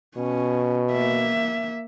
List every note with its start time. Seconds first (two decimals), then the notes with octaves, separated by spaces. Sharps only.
0.17 B2 C#4
0.92 A#3 E5